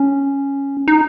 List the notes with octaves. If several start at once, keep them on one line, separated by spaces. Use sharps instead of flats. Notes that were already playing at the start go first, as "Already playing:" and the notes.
Already playing: C#4
D#4